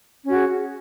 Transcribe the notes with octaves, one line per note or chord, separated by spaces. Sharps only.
C#4 F#4 G#4